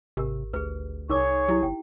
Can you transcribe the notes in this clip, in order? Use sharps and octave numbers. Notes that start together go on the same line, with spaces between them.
G#1 C3 G4 A#4
D2 G#4 B4
C2 D#4 G#4 A#4 C#5 C#6 D6
F#3 E4 G4
G1 G5